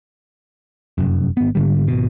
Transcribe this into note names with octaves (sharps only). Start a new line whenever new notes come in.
F1 F#2
G#1 B3
G#2 D3 G3
G#1 B2